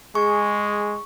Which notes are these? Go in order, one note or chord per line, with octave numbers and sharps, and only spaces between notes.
G#3 G#4 C#6